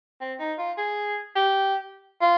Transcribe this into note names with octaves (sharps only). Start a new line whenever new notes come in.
C4
D#4
F4
G#4
G4
F4